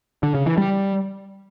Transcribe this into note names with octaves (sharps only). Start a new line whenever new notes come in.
D3
C#3
E3
G3